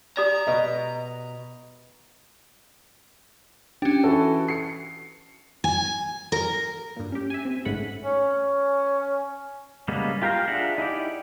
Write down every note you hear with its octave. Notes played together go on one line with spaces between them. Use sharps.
G4 D5 A#5
B2 D#5
C#4 D4 G4
E3 F#4 A4
C7 C#7
G#5
A#4
G2 A#2
C#4 G4
E5 G#5
C4
A1 G#2 C#3 A3 F#5 B5
C#4
C#3 G3 G#3 A#3 B3
F4 G4 A#4 F5 A#5
D4 F4 G#4 E5 F#5
D#4 E4 G4 D5